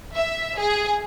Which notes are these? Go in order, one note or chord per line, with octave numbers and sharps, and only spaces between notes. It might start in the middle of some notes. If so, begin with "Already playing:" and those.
E5
G#4